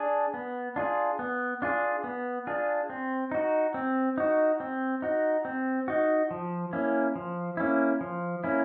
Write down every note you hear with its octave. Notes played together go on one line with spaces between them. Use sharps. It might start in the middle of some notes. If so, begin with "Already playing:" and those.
Already playing: D4 G#4
B3
D4 F4 G#4
B3
D4 F4 G#4
B3
D4 F4 G#4
C4
D#4 F#4
C4
D#4 F#4
C4
D#4 F#4
C4
D#4 F#4
F3
A#3 C#4 E4
F3
A#3 C#4 E4
F3
A#3 C#4 E4